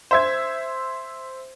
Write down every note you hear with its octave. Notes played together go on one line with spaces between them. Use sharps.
C5 E5 G#6